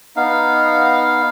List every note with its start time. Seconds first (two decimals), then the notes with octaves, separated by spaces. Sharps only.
0.16 B3 D#4 F5